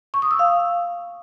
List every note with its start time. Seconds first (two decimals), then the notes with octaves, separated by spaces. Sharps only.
0.14 C#6
0.22 D#6
0.31 E6
0.39 F5